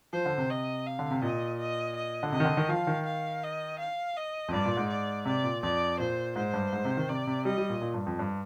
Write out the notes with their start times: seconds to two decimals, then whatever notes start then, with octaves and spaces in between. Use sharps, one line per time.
0.12 F3 C5
0.26 D3
0.38 C3
0.50 D#5
0.86 F5
0.99 D3
1.11 C3
1.22 A#2 D#5
1.59 D#5
1.96 D#5
2.23 D3
2.32 C3 D#5
2.40 D#3
2.45 D3
2.57 D#3
2.69 F3 F5
2.87 D#3
3.05 F5
3.43 D#5
3.79 F5
4.16 D#5
4.48 F2
4.53 G2 D5
4.66 A#2
4.77 G#2
4.90 D5
5.25 C3 D5
5.44 A#2
5.63 F2 D5
5.99 A#2 C5
6.36 G#2 C5
6.54 G2
6.73 G#2
6.85 C3
6.97 D#3
7.09 C3 D5
7.27 C3
7.45 G3 D#5
7.58 G3
7.70 A#2
7.82 A#2
7.94 G2
8.07 F2
8.19 G2